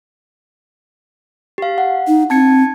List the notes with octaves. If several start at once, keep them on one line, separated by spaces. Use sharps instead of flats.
G4 F5
F#5
D#4
C4 A5 G#6 C#7